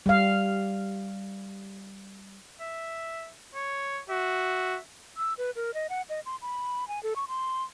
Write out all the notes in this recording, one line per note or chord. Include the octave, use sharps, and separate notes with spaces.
G3 F5
E5
C#5
F#4 E5
E6
B4
A#4
D#5
F#5
D#5
C6
B5
G#5
A4
C#6
C6